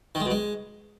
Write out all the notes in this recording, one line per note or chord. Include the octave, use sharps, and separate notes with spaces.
D#3
G#3
B2
G#3